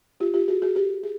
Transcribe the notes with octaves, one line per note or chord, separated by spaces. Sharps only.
F4 G4
F4 G4
F#4 G#4
F#4 G#4
G4 A4
G#4